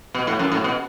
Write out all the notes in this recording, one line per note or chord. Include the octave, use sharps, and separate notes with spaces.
B2
A2
F#2
A2
B2